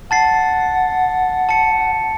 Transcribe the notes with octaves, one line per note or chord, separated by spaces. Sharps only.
F#5 A5 A6 C7
A5 C#7